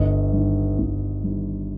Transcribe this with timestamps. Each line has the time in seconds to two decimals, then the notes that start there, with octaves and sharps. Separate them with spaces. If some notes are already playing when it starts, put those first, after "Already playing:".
Already playing: G1 D#5
0.33 G2 D#3
0.79 G1
1.24 G2 D#3